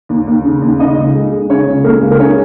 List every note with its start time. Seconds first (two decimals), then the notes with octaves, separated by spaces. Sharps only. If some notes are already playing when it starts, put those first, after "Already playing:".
0.09 D#2
0.27 D#2
0.44 C#3
0.61 D#2
0.79 C#3 D#4 D#5
0.97 C#2
1.14 G#3
1.32 G#3
1.49 C#3 C#4 C#5
1.67 C#2
1.84 G#3 A#3 A#4
2.02 C#2
2.11 A#4
2.20 G#3 C#4 C#5